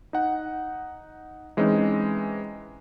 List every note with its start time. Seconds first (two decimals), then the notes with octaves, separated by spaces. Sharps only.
0.13 D#4 F#5
1.57 E3 G#3 C4 C#4 D#4